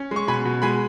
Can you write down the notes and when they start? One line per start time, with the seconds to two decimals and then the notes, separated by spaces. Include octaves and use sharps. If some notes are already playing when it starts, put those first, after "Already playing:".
Already playing: C#4
0.11 G#3 C#6
0.28 B2 G#5 B5
0.45 B2
0.62 G#3 G#5 B5